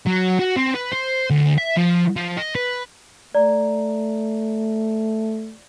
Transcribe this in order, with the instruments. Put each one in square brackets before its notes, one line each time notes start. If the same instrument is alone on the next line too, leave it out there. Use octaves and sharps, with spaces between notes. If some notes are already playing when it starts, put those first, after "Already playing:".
[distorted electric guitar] F#3
F#4
C4
B4
C5
D2
E5
F3
F3
D#5
B4
[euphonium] A3 [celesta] D5 A#5